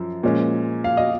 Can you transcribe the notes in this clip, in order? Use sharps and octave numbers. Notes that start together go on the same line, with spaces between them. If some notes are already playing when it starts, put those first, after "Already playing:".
Already playing: F#2 F3
A#2 F3 G#3 C#4
F5
D#5